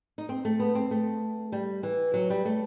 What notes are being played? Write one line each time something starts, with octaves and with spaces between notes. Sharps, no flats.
D#4
C4
A3
B3
C4
A3
G3
E3
F#3
G3
A3